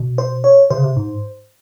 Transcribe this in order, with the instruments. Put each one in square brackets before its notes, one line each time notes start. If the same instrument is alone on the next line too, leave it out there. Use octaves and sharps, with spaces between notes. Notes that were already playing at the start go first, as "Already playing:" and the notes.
Already playing: [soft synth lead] B2
[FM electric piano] C5
C#5
[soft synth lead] C3 [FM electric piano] C5
[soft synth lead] C#3
C3
G#2